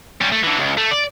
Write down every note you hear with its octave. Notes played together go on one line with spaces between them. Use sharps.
G3 C#4
A3
D3 E3
C#2
A3
D5